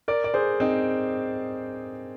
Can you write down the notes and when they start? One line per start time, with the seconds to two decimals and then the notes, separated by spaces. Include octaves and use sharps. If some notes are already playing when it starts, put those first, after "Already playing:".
0.08 A#4 D5
0.24 D5
0.34 G#4 C5
0.60 C4 D#4